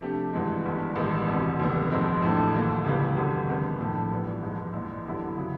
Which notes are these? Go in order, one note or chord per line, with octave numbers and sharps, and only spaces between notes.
C3 F3 A3 D4 G4
G#1 G2 E3 G#3
G1 G2 E3
A1 G2 D#3 G#3 B3
E1 D2 C3
F1 D#2 D#3 G3 B3
A#1 G#2 F3 G#3 C4
A1 A2 F3 A3 D4
D#2 D3 F3 A#3
C#2 C#3 E3 G3 A#3
G#1 F#2 D3 G3
C3 D#3 G#3 B3 D4
A#1 A2 F3 A3 D4
G#1 G2 E3 G3 B3
A#1 G#2 F3 G#3
A#1 G#2 E3
F#2 D3 G3 B3 E4
C#3 F#3